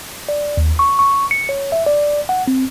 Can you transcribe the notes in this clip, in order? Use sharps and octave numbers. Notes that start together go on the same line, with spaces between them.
D5
D#2
C#6
C#6
C#7
C#5
E5
D5
F#5
C4